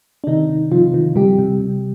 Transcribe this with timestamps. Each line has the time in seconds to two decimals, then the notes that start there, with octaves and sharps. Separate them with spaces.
0.24 D4
0.27 C3 D#3 D#4
0.49 D#3
0.71 C3 F3 F4
0.94 D#3
1.16 C3 G3 G4
1.39 C3
1.60 C3